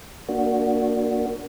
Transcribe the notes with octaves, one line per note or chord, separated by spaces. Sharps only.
A#3 D4 F#4